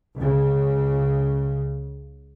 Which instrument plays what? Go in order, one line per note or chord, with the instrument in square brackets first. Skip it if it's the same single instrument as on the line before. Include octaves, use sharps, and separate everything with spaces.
[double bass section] C#2 C#3